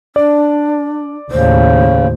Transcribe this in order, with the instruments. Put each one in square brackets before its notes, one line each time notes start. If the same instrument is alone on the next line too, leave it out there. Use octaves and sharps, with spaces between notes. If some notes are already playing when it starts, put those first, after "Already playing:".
[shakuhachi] D4 [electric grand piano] D5
[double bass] D#2 A2 [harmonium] C#3 [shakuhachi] C5